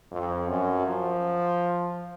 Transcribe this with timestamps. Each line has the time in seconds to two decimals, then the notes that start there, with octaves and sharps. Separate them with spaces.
0.12 F2
0.49 F#2
0.87 F3